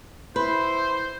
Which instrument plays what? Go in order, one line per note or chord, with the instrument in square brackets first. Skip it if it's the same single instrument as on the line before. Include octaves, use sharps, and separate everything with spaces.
[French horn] E4 [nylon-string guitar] B4 [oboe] C5 [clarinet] C6